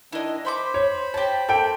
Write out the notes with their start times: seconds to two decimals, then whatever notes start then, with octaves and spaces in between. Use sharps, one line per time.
0.12 D#3 D4 E4 D#5
0.45 C5 E5 B5 C6 D6
0.74 C#5
1.14 G4 C#5 A5
1.49 A#3 A4 G5